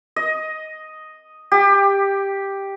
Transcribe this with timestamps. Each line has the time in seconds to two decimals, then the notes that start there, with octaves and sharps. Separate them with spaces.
0.16 D#5
1.52 G4